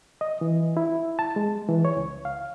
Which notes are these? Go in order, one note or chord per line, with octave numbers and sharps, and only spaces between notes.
D#5
E3
E4
A5
G#3
E3
C#5
C#2
F5